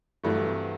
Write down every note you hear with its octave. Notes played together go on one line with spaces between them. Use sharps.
G2 E3 F#3 A3
C3